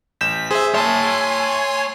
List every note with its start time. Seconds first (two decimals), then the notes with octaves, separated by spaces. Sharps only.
0.21 A1 G6 B6 E7
0.51 G#4 C5 E5
0.74 C#5 E5 G#5 A5 C6